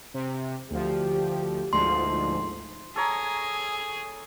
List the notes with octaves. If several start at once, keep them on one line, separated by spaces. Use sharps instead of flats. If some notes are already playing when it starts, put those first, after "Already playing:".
C3
D2 F3 G4
G1 D2 G#2 F3 G#3 C6
G#4 A4 C#5 A#5